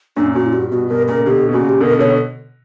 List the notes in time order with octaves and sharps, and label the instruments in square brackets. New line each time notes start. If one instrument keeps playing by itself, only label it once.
[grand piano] F#2 A#2 [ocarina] D4
[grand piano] F#2 A#2 [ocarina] F#4
[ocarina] E4
[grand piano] G2 [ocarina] F#4
[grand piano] G2 B2 [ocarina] F#4
[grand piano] G2 B2 [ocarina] A#4
[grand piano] A#2 C#3 [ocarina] A#4
[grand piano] B2 D3 [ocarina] G4
[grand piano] B2
[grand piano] A#2 C#3 [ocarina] F#4
[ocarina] G4
[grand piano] B2 D3 [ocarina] A#4
[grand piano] B2 D3 [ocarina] C#5